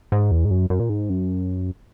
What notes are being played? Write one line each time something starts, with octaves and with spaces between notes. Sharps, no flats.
G#2
E2
G#2
F#2
F#2
A#2
G#2
F#2